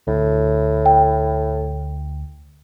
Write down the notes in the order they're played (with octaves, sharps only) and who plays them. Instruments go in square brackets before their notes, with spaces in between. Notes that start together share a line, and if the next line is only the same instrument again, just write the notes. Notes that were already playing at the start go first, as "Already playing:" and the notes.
[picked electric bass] D2 [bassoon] A2
[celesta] G5